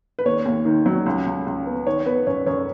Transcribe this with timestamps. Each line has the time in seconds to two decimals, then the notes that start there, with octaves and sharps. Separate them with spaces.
0.19 B4
0.25 D#2 C#5
0.45 D#2
0.65 D#3
0.86 F#3
1.06 C#2
1.26 C#2
1.46 C#2
1.66 B3
1.86 D#3 C#5
2.06 B3 B4
2.27 F#2 C#5
2.46 F#2 C#5